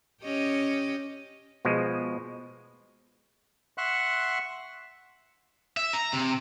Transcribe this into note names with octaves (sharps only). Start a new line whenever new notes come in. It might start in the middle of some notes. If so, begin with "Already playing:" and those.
C#4 G4 D#5
B2 F3 G#3
E5 F#5 C6 C#6 F#6
E5
A#5
C3